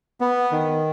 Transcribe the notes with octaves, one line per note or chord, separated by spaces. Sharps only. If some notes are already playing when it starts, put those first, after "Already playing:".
B3
D#3